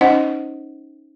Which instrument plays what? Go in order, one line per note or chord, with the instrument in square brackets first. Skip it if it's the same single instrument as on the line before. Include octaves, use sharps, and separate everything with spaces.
[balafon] C#4 D#4 C5 D#5 F#5